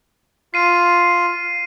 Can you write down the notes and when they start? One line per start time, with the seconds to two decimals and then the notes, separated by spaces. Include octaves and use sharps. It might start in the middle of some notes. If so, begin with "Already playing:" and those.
0.54 F4 C7 D#7